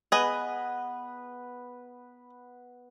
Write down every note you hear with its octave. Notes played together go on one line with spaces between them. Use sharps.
B3 G#4 B4 D#5 E6